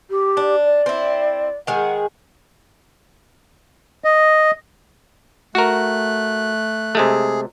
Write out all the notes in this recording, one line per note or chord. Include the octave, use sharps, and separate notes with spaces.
G4
D4
D5
C4 E4
D#3 G#3 G#4 F#5
D#5
A3 F#4 A#4 F#6
C3 G#3 A3 G#4